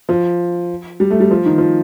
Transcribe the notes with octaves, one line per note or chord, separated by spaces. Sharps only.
F3
G3
A3
G3
F3
D#3
F3